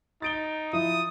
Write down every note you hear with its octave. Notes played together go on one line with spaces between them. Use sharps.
D#4 A6 D7 G7
F3 E4 D#6